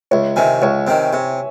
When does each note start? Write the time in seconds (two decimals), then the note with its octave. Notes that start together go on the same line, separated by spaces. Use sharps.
0.11 C#2 C#5 E5
0.36 C3 D#3 E5 G#5
0.62 C#2 C#5
0.87 C3 D#3
1.13 C3